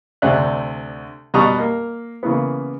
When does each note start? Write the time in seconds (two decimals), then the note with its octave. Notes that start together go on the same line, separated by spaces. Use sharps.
0.22 D2 C3 D5 E5 F#6
1.34 B2 G3 A#5 C#6 D#6 F#6
1.58 A#3
2.23 C#3 E3 A#3 B3